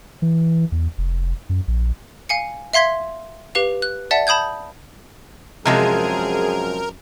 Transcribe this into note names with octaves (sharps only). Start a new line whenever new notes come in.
E3
E2
F1
F#2
A#1
F5 G#5 C#7
E5 F5 C6 G#6 B6
G4 B4 F5 F7
F#6
D5 E5 F#5 A5
A5 B5 D#6 G6 G#6
F#2 C3 F3 G#3 G#4 A#4